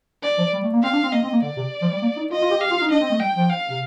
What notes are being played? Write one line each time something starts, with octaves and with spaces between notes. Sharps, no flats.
D5
F3
G3
A3
A#3
C4 F5
D4
C4
A#3 D#5
C4
A#3
D3 D5
C3
F3
G3
A#3
D#4
F4 D#5
F4
G4
G4 F5
F4
D#4
D4 D#5
C4
A3
G3 G5
F3
F5
C3